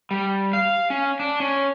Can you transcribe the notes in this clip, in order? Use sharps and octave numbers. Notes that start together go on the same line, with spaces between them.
G3
F5
C#4
D4
C#4